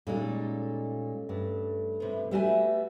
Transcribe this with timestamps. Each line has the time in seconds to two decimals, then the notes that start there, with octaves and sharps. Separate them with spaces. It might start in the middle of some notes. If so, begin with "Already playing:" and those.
0.07 A#2 G3 G#3 C#4 D#4 A4
1.29 G2 A3
2.00 C3 B3
2.31 G3 A3 B3 F#4 E5 G#5